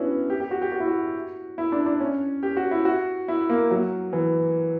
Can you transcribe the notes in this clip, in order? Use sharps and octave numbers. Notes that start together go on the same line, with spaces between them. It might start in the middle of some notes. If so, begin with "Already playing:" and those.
Already playing: B3 C#4 D4 E4 F#4
G4
G4
F#4
G4
F#4
E4
F#4
E4
D4
D4
C#4
G4
F#4
E4
F#4
E4
A#3
F#3
E3